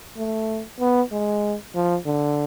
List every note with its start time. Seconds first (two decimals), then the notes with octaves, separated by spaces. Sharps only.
0.17 A3
0.80 B3
1.11 G#3
1.75 F3
2.06 D3